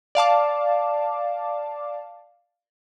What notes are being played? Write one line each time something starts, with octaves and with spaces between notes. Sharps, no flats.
D5 F5 A5 D6